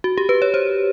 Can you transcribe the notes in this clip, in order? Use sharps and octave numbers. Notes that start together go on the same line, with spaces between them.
F#4
G4
B4
C#5
C5